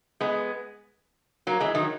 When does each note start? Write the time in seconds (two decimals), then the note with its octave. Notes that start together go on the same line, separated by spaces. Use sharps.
0.20 G#3 B3
1.47 F#3 A#3
1.60 E3 G#3
1.75 D#3 F#3